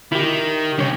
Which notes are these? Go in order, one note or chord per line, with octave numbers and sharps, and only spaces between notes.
D#3 E4 G4
C2 D4 C#5